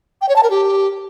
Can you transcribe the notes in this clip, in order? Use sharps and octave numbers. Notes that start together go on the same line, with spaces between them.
G5
C#5
A5
A#4
G4